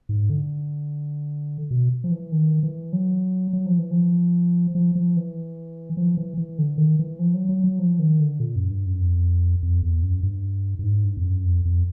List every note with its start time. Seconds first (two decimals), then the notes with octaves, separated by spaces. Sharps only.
0.09 G#2
0.30 D3
1.71 B2
2.04 F3
2.11 E3
2.32 D#3
2.63 E3
2.93 F#3
3.53 F#3
3.66 F3
3.79 E3
3.91 F3
4.75 F3
4.95 F3
5.17 E3
5.97 F3
6.17 E3
6.37 E3
6.59 D3
6.78 D#3
6.99 E3
7.19 F3
7.34 F#3
7.49 F#3
7.64 F#3
7.79 F3
7.99 D#3
8.20 D3
8.40 A#2
8.56 F#2
8.70 G2
8.86 F#2
9.01 F2
9.63 F2
9.83 E2
10.02 F#2
10.23 G2
10.79 G2
10.84 G#2
11.04 G2
11.17 F2
11.25 F#2
11.45 F2
11.65 F2